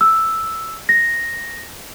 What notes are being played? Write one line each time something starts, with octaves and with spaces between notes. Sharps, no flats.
E6
A#6